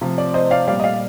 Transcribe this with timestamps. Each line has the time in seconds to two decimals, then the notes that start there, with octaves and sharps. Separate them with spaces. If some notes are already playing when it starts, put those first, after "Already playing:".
0.01 C3 F3
0.18 D5
0.34 C5 D#5
0.51 D5 F5
0.68 A#2 G3 D5 F5
0.80 D#5
0.84 D5 F5